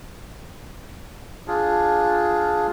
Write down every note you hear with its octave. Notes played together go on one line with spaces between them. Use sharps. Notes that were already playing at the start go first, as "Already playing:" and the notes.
D4 F4 G#4